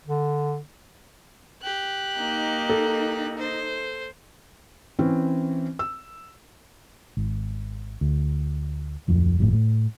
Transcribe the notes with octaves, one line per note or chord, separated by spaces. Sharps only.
D3
G4 F#6
A#3 D#4
A4
C5
E3 C4 C#4
E6
G#1
D2
D1 F2
G1 F2 A2
A2